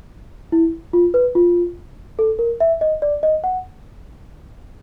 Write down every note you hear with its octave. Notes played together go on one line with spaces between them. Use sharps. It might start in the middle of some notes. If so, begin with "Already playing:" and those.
E4
F4
B4
F4
A4
A#4
E5
D#5
D5
D#5
F#5